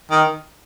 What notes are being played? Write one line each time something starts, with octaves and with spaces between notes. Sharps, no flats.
D#3